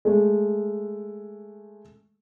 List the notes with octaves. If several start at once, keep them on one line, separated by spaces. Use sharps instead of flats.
G#3 A3